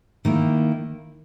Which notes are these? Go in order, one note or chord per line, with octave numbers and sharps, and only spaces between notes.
D#3 A#3 E4